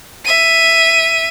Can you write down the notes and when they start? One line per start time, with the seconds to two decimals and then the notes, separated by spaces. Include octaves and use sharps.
0.25 E5 D#7